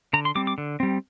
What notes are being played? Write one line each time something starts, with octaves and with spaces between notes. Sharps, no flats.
D3 A#5
C6
G3 C4 D6
D6
D3
G3 C4